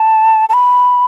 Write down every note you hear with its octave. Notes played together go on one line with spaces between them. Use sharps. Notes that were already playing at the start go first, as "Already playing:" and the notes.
Already playing: A5
A5
B5